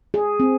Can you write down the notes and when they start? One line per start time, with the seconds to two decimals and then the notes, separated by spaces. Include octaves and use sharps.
0.14 G#4
0.40 C4